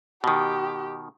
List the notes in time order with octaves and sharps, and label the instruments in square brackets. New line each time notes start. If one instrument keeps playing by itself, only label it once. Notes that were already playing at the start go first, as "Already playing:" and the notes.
[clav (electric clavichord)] B2 D#3 [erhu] G4